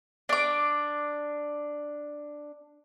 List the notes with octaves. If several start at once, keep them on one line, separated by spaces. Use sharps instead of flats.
D4 D6